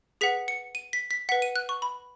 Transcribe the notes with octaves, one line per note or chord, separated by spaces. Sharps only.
G#4 B4 F#5 B6
C#7
D#7
B6
B6
B4 F#5 B6
D#7
F#6
C#6
B5